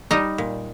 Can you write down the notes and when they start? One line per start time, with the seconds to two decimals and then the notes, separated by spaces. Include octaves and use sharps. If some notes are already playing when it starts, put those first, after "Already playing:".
0.11 G3 D#4 D#5
0.38 A#2